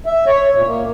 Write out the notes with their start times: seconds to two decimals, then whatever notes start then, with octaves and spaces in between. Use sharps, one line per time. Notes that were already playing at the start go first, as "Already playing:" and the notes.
0.06 E5
0.27 C#5
0.54 A#2
0.66 A#3